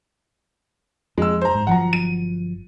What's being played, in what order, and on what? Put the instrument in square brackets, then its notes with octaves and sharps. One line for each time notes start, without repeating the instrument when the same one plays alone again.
[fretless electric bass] F2 [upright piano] G#3 E6
[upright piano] C5 A#5
[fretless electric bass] G#2
[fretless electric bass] G1 F3 F#3 [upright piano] F#5 A#5
[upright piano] D#7